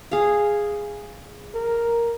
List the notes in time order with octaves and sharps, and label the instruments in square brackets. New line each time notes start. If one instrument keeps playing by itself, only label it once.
[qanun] G#4 F5
[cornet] A#4